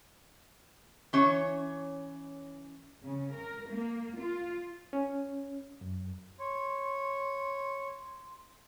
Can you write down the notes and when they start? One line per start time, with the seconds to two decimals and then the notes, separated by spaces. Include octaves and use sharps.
1.13 E3 C#4 C#5
3.04 C#3
3.35 A#4
3.71 A#3
4.20 F4
4.93 C#4
5.81 F#2
6.39 C#5 C6